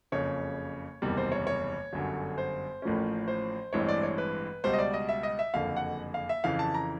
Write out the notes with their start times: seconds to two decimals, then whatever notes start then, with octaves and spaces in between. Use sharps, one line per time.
0.12 F#1 F2 C#3 C#5
1.02 F#1 E2 C3 D#3 G3
1.17 C5
1.32 C#5
1.47 C#5
1.93 G1 F#2 D3
2.38 C5
2.82 A1 A2 F3 A#3 C#4
3.28 C5
3.73 A1 G2 E3 G#3 C4 C#5
3.89 D5
4.03 C#5
4.18 B4
4.64 C#2 B2 G3 C5
4.73 D#5
4.79 D5
4.94 D#5
5.09 E5
5.23 D#5
5.39 E5
5.54 F#1 F2 D3 F5
5.76 F#5
6.14 F5
6.29 E5
6.44 F2 C#3 E3 F5
6.59 A5
6.74 A#5